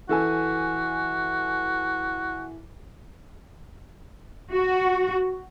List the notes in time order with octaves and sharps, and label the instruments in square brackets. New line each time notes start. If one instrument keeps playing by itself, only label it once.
[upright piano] E3 A4 G#5 [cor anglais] F#4
[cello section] F#4